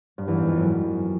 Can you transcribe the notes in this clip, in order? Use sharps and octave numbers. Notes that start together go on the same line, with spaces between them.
G2
E2
G#2
F2
F#2